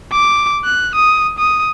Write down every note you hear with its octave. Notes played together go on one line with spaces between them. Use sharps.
D6
F#6
D#6
D#6